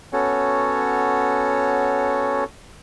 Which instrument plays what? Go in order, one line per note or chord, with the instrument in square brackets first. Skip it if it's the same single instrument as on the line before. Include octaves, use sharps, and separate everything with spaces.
[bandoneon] B3 C#4 F#4 A4 C#5